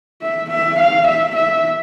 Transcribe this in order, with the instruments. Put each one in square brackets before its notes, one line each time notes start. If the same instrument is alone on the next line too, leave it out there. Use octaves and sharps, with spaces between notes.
[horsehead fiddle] E5
E5
F5
E5
E5